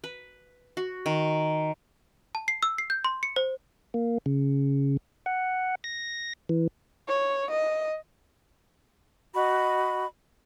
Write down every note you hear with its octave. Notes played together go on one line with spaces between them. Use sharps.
B4
F#4
D#3
A5
C7
E6
C7
G6
C6
C#7
C5
A#3
C#3
F#5
A#6
E3
C#5
D#5
F#4 D#5 B5